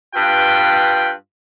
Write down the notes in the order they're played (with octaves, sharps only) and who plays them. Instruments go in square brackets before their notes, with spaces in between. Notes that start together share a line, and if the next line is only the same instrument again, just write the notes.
[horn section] G2 F4 B4 G5